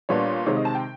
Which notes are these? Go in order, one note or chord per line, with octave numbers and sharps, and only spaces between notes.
A#2 G3 B3 D4 C#5
C3 D#3 G#3 C#5
D#5
A5
G5